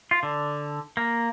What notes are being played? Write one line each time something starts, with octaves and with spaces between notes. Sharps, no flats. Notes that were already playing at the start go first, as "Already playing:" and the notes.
F4
D3
A#3